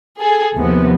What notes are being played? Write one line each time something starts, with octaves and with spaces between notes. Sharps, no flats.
G#4 A4
D#2 C3 F3 B3